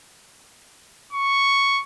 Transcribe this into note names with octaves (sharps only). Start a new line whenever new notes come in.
C#6